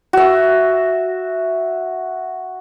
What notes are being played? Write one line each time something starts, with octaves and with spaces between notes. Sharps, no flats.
F#4 E5